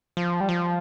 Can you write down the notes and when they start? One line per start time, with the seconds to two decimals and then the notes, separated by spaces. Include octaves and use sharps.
0.17 F3
0.41 G3
0.49 F3